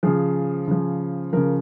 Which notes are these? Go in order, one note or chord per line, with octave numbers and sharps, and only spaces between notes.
C#3 F3 G#4
C#3 F3
C#3 F3 A#4